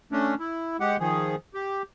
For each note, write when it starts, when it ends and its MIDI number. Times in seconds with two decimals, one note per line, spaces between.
0.12 0.35 57
0.12 0.35 61
0.12 0.35 62
0.39 0.77 64
0.80 0.97 56
0.80 0.97 67
0.80 0.97 78
1.00 1.36 51
1.00 1.36 53
1.00 1.36 68
1.54 1.82 67